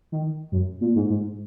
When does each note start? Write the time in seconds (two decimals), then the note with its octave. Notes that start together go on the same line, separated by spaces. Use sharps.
0.12 D#3
0.52 F#2
0.81 A#2
0.96 G#2
1.10 G#2